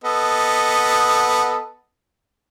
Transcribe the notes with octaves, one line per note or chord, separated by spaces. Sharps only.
B3 A4 D#5